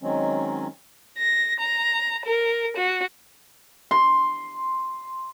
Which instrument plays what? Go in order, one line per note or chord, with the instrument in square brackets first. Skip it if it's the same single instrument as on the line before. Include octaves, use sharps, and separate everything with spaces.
[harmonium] D#3 F#3 G#3 C4 C#4
[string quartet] A#6
A#5
A#4
F#4
[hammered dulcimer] C6